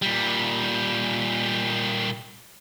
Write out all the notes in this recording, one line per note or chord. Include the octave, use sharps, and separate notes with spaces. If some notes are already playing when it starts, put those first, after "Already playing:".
A#2 G3